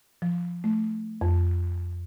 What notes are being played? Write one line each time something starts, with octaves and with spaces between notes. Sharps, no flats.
F3
A3
F2